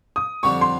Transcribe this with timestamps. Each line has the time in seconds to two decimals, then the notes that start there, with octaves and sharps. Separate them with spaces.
0.16 D#6
0.43 F2 D3 G3 C4 C#6
0.61 C6